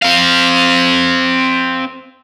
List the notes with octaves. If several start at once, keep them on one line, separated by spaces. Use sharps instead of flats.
C4 F5